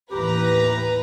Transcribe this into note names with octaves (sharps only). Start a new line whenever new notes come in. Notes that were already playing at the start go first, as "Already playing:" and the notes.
D#2 A2 E3 G4 B4 A#5